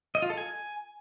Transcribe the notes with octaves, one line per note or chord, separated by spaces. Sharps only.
D#5
F4
A4
G#5